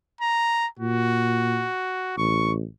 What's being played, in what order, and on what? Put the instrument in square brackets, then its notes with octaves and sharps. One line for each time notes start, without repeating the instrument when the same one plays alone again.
[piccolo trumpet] A#5
[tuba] A#2 [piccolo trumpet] F#4
[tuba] A1 [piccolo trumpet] C#6